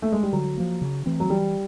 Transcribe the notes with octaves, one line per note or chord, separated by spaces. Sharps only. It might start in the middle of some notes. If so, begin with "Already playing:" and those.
A3
G#3
G3
D3 F#3
F3 A#3
C#3
E3 A3 C4
F#3
E3 G3